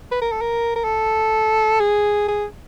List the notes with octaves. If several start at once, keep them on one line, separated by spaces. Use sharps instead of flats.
B4
A#4
A4
A#4
A#4
A4
G#4
G#4